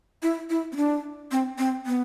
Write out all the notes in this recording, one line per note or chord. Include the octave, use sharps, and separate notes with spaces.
E4
E4
C4
D4
C4
C4
B3